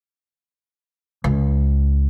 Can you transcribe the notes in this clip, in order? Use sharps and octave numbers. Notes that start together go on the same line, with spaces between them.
C#2